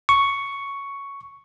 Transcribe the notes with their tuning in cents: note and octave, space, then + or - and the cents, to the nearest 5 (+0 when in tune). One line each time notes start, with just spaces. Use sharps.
C#6 +5